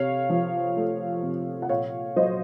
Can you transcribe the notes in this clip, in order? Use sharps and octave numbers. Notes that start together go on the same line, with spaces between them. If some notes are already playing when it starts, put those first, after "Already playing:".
Already playing: C3 C#5 F5
F3
A3
C3
F#5
A#2 C#5 F5
F#3 C5 D#5